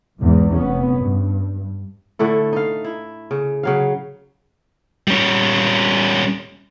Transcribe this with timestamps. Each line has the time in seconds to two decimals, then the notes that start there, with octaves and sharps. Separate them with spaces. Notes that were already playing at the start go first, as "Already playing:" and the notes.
0.20 B1 E2 G#2
0.55 F1 B3 C#4
0.97 G2
2.19 A2 D3 A3 E4
2.53 D#4 F5
2.84 E4
3.31 C#3
3.63 C#3 F#3 F5
5.08 G3 C#4